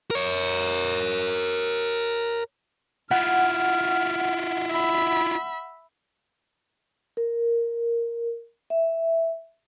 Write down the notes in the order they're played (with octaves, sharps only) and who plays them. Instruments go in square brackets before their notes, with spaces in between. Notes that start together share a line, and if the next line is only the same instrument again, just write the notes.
[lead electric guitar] A#4 C#5
[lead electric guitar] E4 F4 [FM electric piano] F#5 [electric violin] F6
[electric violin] E5 B5
[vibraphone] A#4
E5